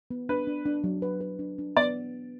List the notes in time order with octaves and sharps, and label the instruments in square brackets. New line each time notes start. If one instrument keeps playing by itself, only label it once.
[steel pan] B3
[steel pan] D4 [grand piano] B4
[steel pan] D4
D4
F#3
B4
B4
D4
D4
[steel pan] B3 [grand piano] D5